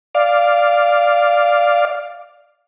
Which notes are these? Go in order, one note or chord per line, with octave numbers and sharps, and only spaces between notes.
D5 F5